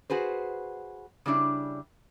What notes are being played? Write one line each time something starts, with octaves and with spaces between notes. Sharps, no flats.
F#4 G#4 B4 C5
C#3 G3 D4 E4